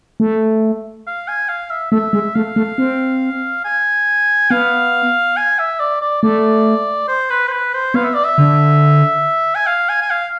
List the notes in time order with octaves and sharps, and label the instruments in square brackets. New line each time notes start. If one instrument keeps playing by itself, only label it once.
[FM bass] A3
[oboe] F5
G#5
F5
E5
[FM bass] A3 [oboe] E5
[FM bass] G#3
[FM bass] A3 [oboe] F5
[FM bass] A3
C4
[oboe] G#5
[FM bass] B3 [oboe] F5
[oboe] G#5
E5
D5
D5
[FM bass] A3 [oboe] D5
[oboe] C5
B4
C5
B4
C5
[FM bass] B3 [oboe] F5
[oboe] E5
D5
E5
[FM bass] D3
[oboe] G#5
F5
G#5
G#5
F5